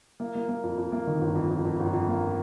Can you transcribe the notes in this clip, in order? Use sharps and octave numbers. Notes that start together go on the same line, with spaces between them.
A#3
A#3
A#3
F2
F2
A#3
D#3
G1
F2
F2
F2
G1
F2
A#3